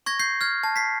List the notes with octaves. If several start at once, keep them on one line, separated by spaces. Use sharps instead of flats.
C#6 G#6 A#6
G6 C7
F6 G#6
A5
B6 C7